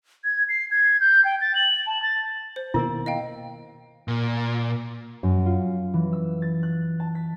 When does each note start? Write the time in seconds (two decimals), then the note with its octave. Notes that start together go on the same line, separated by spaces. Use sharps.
0.24 G#6
0.49 C7
0.71 G#6
1.00 G6
1.25 G5
1.41 A6
1.55 F#7
1.86 A5
2.02 A6
2.56 C5
2.74 B2 D#3 A#3 E4 A#4
3.06 D#5 F5 G5
4.08 A#2
5.23 F#2
5.46 F4
5.94 E3
6.13 E6
6.42 A6
6.63 F#6
7.00 A5
7.15 B6